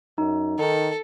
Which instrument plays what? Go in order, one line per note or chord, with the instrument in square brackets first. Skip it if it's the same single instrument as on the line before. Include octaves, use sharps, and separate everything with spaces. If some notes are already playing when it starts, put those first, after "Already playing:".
[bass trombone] F#2 [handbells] D#4
[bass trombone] D#3 [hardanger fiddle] A4